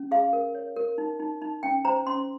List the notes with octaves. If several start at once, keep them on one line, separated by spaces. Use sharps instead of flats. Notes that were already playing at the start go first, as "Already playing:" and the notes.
Already playing: C#4
G#4 F5
A#4
C#5
A#4
D#4
D#4
D#4
C#4 G5
C5 A#5
C#4 C6